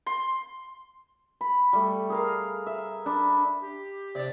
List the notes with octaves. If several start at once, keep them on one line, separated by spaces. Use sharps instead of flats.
C6
B5
G3 A3
G#4 A#4 F5
E5
D4 B5
G4
C3 D4 D5